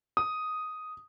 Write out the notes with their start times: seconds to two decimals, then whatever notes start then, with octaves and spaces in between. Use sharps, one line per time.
0.17 D#6